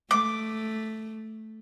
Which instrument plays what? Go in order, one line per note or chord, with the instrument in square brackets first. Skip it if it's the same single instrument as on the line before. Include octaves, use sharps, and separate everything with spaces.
[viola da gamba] A3 [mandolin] D6